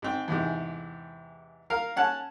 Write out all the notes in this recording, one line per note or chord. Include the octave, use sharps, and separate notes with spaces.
G#2 C4
E2 G#2 C3
A#4 F5
C#4 F#5 A5